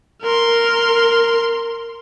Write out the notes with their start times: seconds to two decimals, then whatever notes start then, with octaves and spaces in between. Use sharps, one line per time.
0.22 A#4 C6